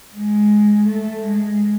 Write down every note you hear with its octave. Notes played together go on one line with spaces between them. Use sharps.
G#3
A3
G#3